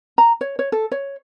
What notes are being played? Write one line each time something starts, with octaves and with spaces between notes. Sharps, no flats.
A#5
C#5
C#5
A4
C#5